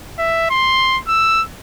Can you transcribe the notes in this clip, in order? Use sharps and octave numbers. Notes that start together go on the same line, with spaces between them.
E5
C6
E6